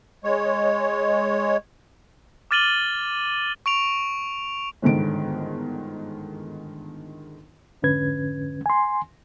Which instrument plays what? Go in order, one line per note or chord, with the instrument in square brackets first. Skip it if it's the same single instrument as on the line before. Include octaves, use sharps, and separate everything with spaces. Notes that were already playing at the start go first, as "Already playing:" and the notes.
[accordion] G#3 C#5
[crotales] D6 F6 A6 D#7 F#7 G7
C#6 D7 F7
[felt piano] G1 E2 G#2 D3 D#3 D7
[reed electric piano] F2 G#2 D3 C#4 B4 G#6
G#5 C6